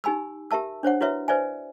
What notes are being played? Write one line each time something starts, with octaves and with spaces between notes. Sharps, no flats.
D#4 G4 G#5 B5 E6
G4 A#4 E5 A5 E6
D4 C5 C#5 F#5
E4 F#4 B4 C#5 E5
B4 C5 D5 E5 G#5